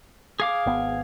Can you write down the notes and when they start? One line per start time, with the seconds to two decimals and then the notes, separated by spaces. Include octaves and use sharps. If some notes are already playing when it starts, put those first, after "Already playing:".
0.40 G#4 F5 D6
0.66 G#1 B3